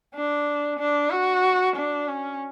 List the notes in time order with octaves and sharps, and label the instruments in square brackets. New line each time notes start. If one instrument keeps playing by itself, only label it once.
[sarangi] D4
D4
F#4
D4
C#4